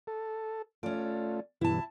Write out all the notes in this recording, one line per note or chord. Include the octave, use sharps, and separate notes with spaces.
A4
A3 C#4 F4 D5
G2 B2 E3 E4 A5